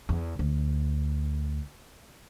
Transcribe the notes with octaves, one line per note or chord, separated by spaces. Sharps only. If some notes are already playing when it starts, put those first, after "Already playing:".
E2
D2